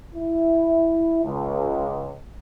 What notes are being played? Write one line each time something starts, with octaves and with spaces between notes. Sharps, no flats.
E4
C#2